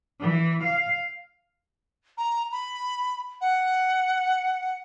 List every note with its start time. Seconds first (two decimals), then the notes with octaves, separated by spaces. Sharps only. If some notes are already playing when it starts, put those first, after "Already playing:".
0.21 E3
0.63 F5
2.18 A#5
2.52 B5
3.41 F#5